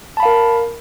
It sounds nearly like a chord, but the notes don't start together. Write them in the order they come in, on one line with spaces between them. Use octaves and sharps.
A5 B5 F5 A#4